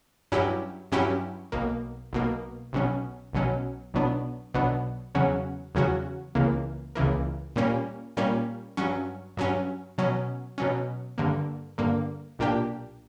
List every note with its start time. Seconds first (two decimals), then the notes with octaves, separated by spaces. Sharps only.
0.32 G2 F#3 C#4 E4 G4
0.92 G2 F#3 C#4 E4 G4
1.52 B1 B2 A#3
2.13 B1 B2 A#3
2.73 B1 B2 F#3 C#4
3.33 B1 B2 F#3 C#4
3.94 B1 B2 F#3 B3 D4
4.54 B1 B2 F#3 B3 D4
5.15 E2 C#3 F#3 C#4 F#4
5.75 E2 C#3 F#3 C#4 F#4
6.35 C#2 C#3 E3 A#3
6.95 C#2 C#3 E3 A#3
7.56 A#2 G3 A#3 C#4
8.17 A#2 G3 A#3 C#4
8.77 G2 F#3 C#4
9.37 G2 F#3 C#4
9.98 B2 F#3 C#4
10.58 B2 F#3 C#4
11.18 G2 D3 A#3
11.78 G2 D3 A#3
12.39 B1 A#2 A#3 D4 G4